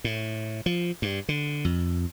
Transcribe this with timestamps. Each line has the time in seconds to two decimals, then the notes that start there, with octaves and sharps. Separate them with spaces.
0.04 A2
0.66 F3
1.02 G2
1.29 D3
1.65 F2